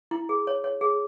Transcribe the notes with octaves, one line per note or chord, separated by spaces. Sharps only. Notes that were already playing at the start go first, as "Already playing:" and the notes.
E4
G#4
C#5
C#5
G#4